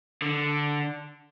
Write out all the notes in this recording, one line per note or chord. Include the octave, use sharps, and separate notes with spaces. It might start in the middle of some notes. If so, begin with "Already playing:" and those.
D3